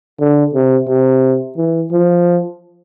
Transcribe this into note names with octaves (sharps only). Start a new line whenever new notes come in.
D3
C3
C3
E3
F3